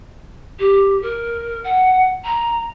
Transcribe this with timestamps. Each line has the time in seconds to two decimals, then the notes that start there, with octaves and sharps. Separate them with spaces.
0.59 G4
1.02 A#4
1.64 F#5
2.24 A#5